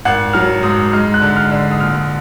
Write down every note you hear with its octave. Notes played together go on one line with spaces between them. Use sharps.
G#1 F#5
F#3 F6
G#2 D#6
G#3 F6
F#6
D3
F6
D3
D#6
A#1 F6